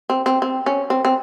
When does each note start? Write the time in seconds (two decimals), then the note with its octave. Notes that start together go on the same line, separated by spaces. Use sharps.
0.10 C4
0.26 C4
0.42 C4
0.66 C#4
0.90 C4
1.05 C4